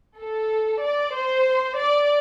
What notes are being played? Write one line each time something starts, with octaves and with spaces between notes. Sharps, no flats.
A4
D5
C5
D5